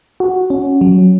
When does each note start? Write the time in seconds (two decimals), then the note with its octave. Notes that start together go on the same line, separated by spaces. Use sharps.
0.20 F#4
0.50 C#4
0.81 F#3